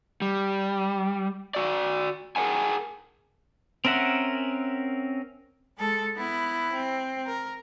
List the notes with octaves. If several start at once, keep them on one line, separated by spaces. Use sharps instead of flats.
G3
F#4 D5
G#4 A#4 B4 C#5 F#5 G#5
C4 C#4 A#4 E5 F#5
G#3 A4
B3 E4
C4
A#4